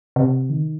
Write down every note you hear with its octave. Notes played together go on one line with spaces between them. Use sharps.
C3
D#3